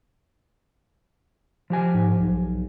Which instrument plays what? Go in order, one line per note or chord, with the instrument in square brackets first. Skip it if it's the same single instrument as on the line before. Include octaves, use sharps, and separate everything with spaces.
[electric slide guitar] F3 G4 G#5
[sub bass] G#2
B1